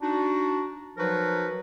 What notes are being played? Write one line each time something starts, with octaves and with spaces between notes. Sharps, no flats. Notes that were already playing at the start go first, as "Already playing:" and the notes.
D4 D#4 F#4
F3 F#3 D#4 F#4 A#4 B4